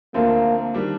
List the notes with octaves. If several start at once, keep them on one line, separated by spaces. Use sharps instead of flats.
D2 D3 F3 A#3 C4
D#3 G3 D4